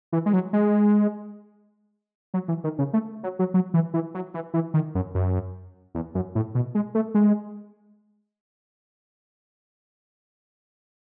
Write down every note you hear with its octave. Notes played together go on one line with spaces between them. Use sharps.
E3
G#3
F#3
G#3
F#3
E3
D#3
C#3
A3
F#3
F#3
F#3
E3
E3
F#3
E3
E3
D#3
F#2
F#2
E2
F#2
A2
B2
G#3
A3
G#3